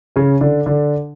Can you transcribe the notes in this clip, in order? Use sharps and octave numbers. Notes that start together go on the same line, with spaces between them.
C#3 C#4
D3 D4
D3 D4